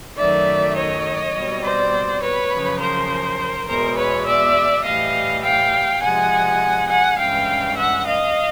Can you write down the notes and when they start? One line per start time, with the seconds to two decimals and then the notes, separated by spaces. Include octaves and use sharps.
0.17 F#2 D#3 F#3 A3 D5 E5
0.75 C#5 D#5
1.34 B2 G3 C4
1.62 C5 D5
2.21 B4 C#5
2.51 F#2 C#3 F3
2.79 A#4 C5
3.67 E2 B2 G#3 A#4 C5
3.96 B4 C#5
4.26 D5 E5
4.84 A2 E3 G3 D#5 F5
5.42 F5 G5
6.01 C3 F3 G#3 F#5 G#5
6.89 F#5 G#5
7.18 G2 E3 G#3 C#4 F5 G5
7.76 E5 F#5
8.05 D#5 F5